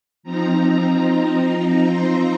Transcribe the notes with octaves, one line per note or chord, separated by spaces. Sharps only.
F3 C4 D#4 A#5
C6